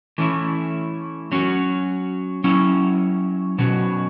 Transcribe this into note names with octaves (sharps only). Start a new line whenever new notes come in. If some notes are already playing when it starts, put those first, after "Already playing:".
E3 A3 C#4 E4
F#3 C#4 F#4
F#3 C#4 E4
B2 F#3 C#4 F#4